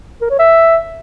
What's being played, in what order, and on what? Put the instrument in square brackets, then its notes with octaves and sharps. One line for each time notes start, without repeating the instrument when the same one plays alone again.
[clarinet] A#4
C#5
E5